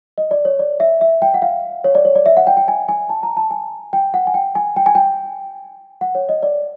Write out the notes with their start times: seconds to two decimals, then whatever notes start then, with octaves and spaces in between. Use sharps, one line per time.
0.18 D#5
0.31 D5
0.45 C#5
0.59 D5
0.80 E5
1.01 E5
1.22 G5
1.34 F#5
1.42 F5
1.84 C#5
1.95 D5
2.05 C#5
2.15 D5
2.26 E5
2.37 F#5
2.47 G5
2.57 G5
2.68 G#5
2.88 G#5
3.09 A5
3.23 A#5
3.37 A5
3.51 G#5
3.93 G5
4.14 F#5
4.27 G#5
4.34 G5
4.55 G#5
4.76 G5
4.86 G#5
4.95 G5
6.01 F#5
6.15 C#5
6.29 D#5
6.43 D5